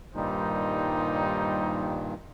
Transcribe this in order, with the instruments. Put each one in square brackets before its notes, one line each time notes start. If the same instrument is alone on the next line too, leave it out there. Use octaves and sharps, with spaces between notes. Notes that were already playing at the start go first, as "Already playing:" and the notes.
[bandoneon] G2 A#2 D#3 [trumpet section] G3 D#4 C5